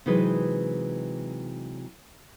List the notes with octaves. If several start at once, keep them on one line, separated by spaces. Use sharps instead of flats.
C3 E3 F#3 G#3 D#4 B4